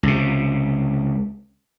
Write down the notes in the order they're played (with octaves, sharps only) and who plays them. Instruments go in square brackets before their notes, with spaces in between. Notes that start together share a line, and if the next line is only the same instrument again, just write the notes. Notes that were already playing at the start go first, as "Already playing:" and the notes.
[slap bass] C#2 C3